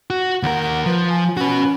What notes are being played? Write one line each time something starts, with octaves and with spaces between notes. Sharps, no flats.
F#4
D#2 A#4 F#5
F#5
F3 B4
G#5
C#4 F#4 B4